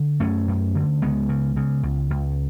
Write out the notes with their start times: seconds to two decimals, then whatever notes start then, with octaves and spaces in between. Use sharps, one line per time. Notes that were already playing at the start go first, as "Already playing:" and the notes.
Already playing: D3
0.20 F#2 A3 C#4
0.48 F#2
0.75 D3
1.02 C#2 G#3 B3
1.29 C#3
1.56 C#3
1.83 C#2
2.10 C#2